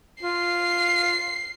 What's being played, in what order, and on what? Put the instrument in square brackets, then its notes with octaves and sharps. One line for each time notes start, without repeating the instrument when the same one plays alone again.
[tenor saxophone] F4 [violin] C7